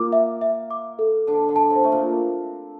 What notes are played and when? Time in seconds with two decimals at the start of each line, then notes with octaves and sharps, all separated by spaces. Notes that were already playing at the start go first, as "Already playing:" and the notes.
Already playing: A#2 A#3 D6
0.13 E5
0.41 E5
0.71 D6
0.99 A4
1.27 D3 D4 A4
1.49 D3 D4
1.56 A5
1.70 C3 C4
1.84 A3 E5
1.92 A#2 A#3